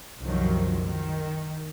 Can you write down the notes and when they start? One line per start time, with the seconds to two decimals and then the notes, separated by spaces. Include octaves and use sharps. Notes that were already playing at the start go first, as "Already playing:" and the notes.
0.22 C2 F#2 D#3 F3 F#3
0.86 D#3